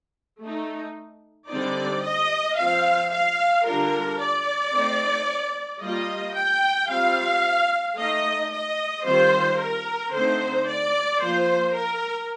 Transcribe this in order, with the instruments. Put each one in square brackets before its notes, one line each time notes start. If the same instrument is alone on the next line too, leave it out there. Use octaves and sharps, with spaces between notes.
[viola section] A3 D#4
D3 G3 C4 D#4 D5
D#5
F3 C4 F4 F5
F5
D3 G3 D4 F4 A#4
D5
A3 C4 D#4
G3 A#3 F4 D#5
G5
G3 C4 F4 F5
A3 D#4 D#5
D#5
D#3 G3 C4 F4 C5
A#4
D3 A3 C4 D#4 C5
D5
F3 A#3 F4 C5
A#4